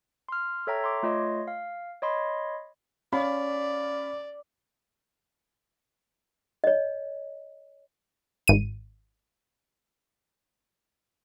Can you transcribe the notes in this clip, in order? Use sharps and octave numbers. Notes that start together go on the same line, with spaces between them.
C6 F6
A4 C#5 E5 G5 A#5
C6 D6
A3 F4 C#5 D#5 C6
F5
C#5 D#5 B5 C6
C#4 D5 F5 B5
C#5 D#5
G#1 D#7